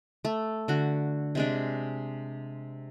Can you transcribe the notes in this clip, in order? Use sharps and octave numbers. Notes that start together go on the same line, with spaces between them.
A3
D3 F#4
C3 G#3 D4